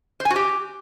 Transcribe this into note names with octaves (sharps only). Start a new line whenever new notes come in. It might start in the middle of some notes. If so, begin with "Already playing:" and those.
C5
G#5
F#4
G4